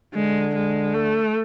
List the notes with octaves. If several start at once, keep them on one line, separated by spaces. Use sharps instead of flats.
D3 G#3
G#3
A3